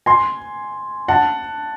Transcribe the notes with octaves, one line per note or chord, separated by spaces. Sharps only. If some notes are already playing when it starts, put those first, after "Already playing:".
G#5 C6
F#5 A5